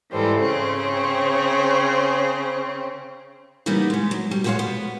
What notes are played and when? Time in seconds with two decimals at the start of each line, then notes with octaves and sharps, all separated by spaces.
0.12 G#2 E3 G3 A4 C5
0.41 C#3 C4 C5 C#5
3.66 C#3 E3 G3 A#3 B3 D#4
3.90 G#3 B3
4.11 F#3
4.31 G3
4.44 F3 G#3 F#4 G#4 C#5 F5
4.59 B3